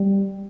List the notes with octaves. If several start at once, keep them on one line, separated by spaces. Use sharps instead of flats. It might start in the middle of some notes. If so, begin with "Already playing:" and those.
Already playing: G3